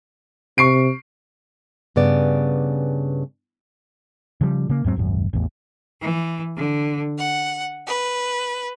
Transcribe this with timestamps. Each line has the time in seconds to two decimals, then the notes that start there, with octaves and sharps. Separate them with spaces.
0.58 C3 C#6 C7 D7
1.96 G2 C#3 B3 D5
4.41 C#3 F3 G3
4.69 C#3 A#3
4.84 E2 G#2 F#3 C4
4.96 D#1 G#1 F#2
5.33 A1 E2
6.01 E3
6.57 D3
7.17 F#5
7.87 B4